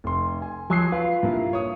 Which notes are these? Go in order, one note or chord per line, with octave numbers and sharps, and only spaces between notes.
F1 C6
G#5
F3 F#3 G#5 C7
F4 B4
G2 A#3 E4
C#5 D#6